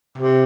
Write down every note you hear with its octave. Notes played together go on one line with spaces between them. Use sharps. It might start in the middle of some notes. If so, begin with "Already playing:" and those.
C3